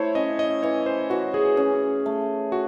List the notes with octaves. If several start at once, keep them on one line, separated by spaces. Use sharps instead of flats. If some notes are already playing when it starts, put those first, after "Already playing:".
Already playing: A3 E4 C5 C#5
C#4 D#5
D#5
E3 C#5
C5
E3 F#4
G#4
C#4
A3
F#4